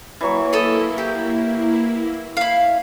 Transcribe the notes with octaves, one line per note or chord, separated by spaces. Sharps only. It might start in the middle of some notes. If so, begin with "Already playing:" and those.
E3 F#3 A#3 E4 C#6
A4 D#5
G4
E4 F5